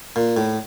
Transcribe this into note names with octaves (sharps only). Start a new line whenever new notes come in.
A#2
A2